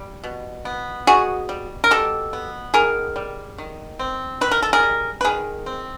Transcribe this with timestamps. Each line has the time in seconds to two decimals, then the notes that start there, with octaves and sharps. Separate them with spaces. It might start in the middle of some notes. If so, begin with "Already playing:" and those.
Already playing: G3
0.24 B2
0.65 B3
1.07 B2 F#4 G#4
1.49 G3
1.84 A#4
1.91 B2 G4 A4
2.33 B3
2.74 D#3 G#4 A#4
3.16 G3
3.58 D#3
3.99 C4
4.41 D#3 B4
4.51 A#4
4.62 A4
4.73 G#4 A#4
4.83 G3
5.21 B4
5.25 D#3 G#4 A#4
5.66 C4